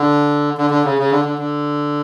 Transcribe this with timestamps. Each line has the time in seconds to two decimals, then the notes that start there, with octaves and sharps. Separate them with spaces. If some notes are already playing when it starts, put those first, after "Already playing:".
Already playing: D3
0.58 D3
0.71 D3
0.85 C#3
0.98 C#3
1.11 D3
1.25 D3
1.38 D3